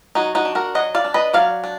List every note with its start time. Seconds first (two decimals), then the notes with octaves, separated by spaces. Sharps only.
0.15 F#3 D#4 F#4
0.35 D#4 F#4
0.45 D4
0.55 F#4 A#4
0.75 F#3 D#5 F#5
0.95 D5 F5
1.04 D4
1.14 B4 D#5
1.33 F#3 D5 F5
1.64 D4